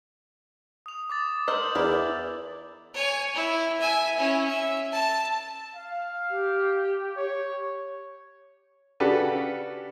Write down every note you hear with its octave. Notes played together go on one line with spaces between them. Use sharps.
D#6 F7
D6 D#6 A6
A#4 C5 D#5 E6 G6 F#7
E2 E4 A#4 D5
C#5 G#5
E4
E5 G#5
C#4 E4
E5
A5
F5
G4
C#5
C#3 D4 F#4 G4 A4 B4